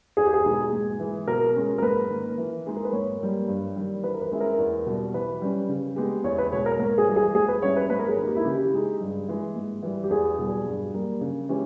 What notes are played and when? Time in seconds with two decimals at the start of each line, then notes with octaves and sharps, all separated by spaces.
0.17 E2 G#4
0.26 G4
0.34 G#4
0.44 B2 G#3 D#4
0.73 G#2
1.00 E3 G#3
1.28 B2 A#4
1.56 G#3 C#4
1.78 A#4
1.82 G#2 B4
2.10 D#3 A#3
2.38 E3
2.66 G#3 D#4 G#4
2.76 A#4
2.85 B4
2.93 G#2 C#5
3.21 G3 A#3
3.48 G2
3.76 D#3 G3
4.03 E3 B4
4.14 A#4
4.22 B4
4.32 G#3 C#4 E4
4.41 A#4
4.59 E2
4.87 B2 G3
5.14 E3 B4
5.42 G3 C#4
5.69 C#3
5.96 G#3 B3 G4
6.24 E2 C#5
6.38 B4
6.52 B2 G#3 C#5
6.66 A#4
6.79 G#2 A#4
6.98 G#4
7.08 E3 G3
7.16 G#4
7.34 G#2 G#4
7.48 B4
7.62 G3 C#4 E4 C#5
7.76 B4
7.90 G#2 B4
7.99 A#4
8.08 G#4
8.17 D#3 A#3 D#4
8.27 G4
8.36 E4
8.45 C#3 G4
8.73 G#3 D#4 G#4
9.01 G2
9.29 E3 G#3
9.56 G#2
9.83 E3 G3
10.04 G4
10.10 E2 G#4
10.39 B2 G3
10.66 G2
10.94 G3 A#3
11.21 C#3
11.49 E3 G#3 C#4 G4